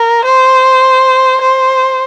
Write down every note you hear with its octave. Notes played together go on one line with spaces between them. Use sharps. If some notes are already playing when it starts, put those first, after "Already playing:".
Already playing: A#4
C5
C5